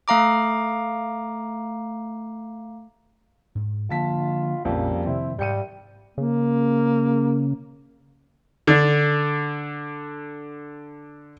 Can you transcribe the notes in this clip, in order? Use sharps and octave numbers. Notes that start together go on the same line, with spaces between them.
A3 F5 A#5 D6
G#2
D3 F3 A#3 F4 A5 B6
A#1 F2 C#3 G3 A#3
C3 D#3 F3 C4 E4
G#2 G3 G6 C#7 D#7
C#3 A#3
D3 D4